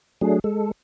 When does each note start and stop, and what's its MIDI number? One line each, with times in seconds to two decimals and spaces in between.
0.21 0.39 54
0.21 0.39 57
0.21 0.39 62
0.21 0.39 68
0.44 0.71 56
0.44 0.71 69